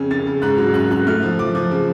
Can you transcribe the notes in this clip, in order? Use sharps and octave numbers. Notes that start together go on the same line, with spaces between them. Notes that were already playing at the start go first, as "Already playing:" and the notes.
Already playing: F2 C#3 C#4
C#4 A6
C#3
G#2 F#6
F#3
C#4 F#6
F#3 F#6
A3 F6
F3
F3 D6
F3
C#3